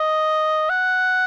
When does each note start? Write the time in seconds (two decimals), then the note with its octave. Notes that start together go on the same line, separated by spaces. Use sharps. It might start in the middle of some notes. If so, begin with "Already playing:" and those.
Already playing: D#5
0.69 F#5